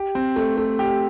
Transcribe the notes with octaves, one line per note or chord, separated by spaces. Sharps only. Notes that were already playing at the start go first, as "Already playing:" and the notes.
Already playing: G4
C4
A3
A3
G4